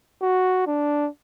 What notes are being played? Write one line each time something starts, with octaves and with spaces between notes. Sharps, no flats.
F#4
D4